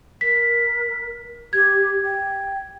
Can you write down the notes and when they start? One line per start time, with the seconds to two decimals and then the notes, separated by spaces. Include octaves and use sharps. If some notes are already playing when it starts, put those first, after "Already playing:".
0.21 A#4 B6
1.53 G4 G#6
2.04 G5